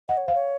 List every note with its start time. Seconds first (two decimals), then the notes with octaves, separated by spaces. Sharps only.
0.08 D#5 F#5
0.17 C#5
0.26 C5 F5
0.35 C#5